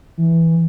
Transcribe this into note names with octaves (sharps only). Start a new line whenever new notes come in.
E3